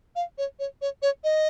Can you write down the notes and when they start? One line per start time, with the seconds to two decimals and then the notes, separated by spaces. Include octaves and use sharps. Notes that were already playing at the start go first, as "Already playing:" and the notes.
0.16 F5
0.38 C#5
0.59 C#5
0.82 C#5
1.02 C#5
1.24 D#5